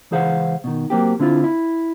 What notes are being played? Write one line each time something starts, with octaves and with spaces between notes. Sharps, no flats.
C#2 E3 G#4 C5 F5 F#5
B2 D#3
F#3 A#3 C4 G4
D3 C4 E4 F4
E4